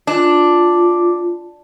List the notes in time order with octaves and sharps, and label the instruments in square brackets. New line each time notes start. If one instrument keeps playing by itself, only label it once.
[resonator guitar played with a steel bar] D4 [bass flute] F4